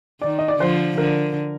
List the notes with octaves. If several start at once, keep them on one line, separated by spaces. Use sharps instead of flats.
D#3 D5
D#5
D5
D3 F3 C5
D3 A#4